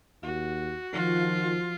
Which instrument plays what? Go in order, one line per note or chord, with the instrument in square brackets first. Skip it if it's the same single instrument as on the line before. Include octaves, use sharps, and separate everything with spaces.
[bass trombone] D#2 [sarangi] F#4
[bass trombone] D#3 [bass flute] F3 [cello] F4